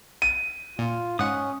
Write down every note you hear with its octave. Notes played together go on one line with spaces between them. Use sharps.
D#7
A#2 F4
G#2 C#4 F#5 D#6